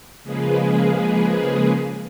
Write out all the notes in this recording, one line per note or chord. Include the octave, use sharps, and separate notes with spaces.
C#3 F3 G#3 A#3 G#4 B4